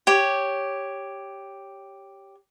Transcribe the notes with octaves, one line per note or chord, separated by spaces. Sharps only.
G4 C#5